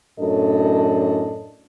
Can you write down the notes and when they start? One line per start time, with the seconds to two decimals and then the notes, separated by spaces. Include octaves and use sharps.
0.20 F#2 A2 D4 A4 D#5